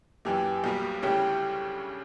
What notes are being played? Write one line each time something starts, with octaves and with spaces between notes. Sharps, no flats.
F#2 E3 A#3 G4
B1 B2 G3 A#3
D2 C#3 G3 C#4 E4 G4